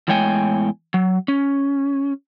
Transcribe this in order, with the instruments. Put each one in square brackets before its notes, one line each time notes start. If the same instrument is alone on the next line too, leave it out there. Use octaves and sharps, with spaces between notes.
[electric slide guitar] E2 A2 G#3 C#5 G5 G#5
F#3
C#4